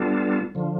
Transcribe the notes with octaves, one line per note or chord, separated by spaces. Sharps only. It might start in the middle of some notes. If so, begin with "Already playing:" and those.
Already playing: G3 B3 D4 F4 A4
D3 F3